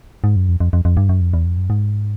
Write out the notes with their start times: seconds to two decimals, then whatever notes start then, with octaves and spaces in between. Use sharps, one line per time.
0.24 G#2
0.36 F#2
0.49 F2
0.60 F2
0.73 F2
0.85 F2
0.97 G2
1.09 F#2
1.21 F2
1.34 E2
1.45 F2
1.57 F#2
1.70 G#2